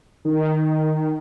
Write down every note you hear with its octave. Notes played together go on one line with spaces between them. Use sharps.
D#3